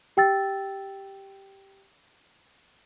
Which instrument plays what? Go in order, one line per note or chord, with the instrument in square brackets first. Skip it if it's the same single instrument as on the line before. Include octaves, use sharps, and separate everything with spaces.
[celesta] G4 G5 E6 A6